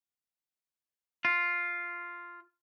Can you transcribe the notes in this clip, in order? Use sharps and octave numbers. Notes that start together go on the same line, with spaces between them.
F4